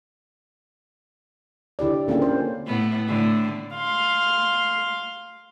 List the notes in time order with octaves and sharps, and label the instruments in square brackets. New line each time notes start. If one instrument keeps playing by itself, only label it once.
[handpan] D3 E4 G4 D5
D3 A#3 C4 C#4 F4 G#4
C5
[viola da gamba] A2 B3
A2 D3 A3
[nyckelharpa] F5 C6